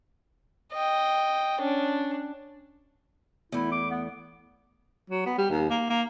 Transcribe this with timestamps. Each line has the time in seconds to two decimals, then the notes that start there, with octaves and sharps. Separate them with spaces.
0.73 D#5 G5
1.61 C#4 D4
3.52 E2 A3 E4
3.72 D6
3.91 B3
5.10 F#3
5.26 B3
5.38 G3
5.50 D#2
5.70 A#3
5.90 A#3